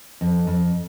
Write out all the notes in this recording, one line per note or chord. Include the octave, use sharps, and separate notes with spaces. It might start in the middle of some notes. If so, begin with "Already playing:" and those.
F2
F2